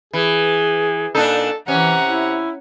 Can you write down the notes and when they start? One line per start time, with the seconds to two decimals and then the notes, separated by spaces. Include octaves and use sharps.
0.13 E3 G#4
1.15 A#2 D4 D#4 A4
1.68 C3 E3 C#4 F#5 A#5
2.07 E4